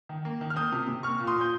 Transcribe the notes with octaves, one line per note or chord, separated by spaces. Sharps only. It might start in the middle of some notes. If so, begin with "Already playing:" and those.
D#3
A#3
D#3
F6
A#3 D#6 G6
C3
C3
A#3 C#6 F6
A#2
C6 D#6
A#2 G6